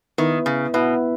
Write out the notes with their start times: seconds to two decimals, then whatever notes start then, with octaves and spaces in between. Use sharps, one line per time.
0.18 D#3 B3 E4 B4 E5
0.46 C#3
0.74 B2 B3 E4 B4 E5